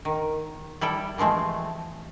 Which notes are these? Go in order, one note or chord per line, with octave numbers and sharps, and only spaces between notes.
D#3
G3 E4 A4 G5
E3 F3 G#3 A3 C4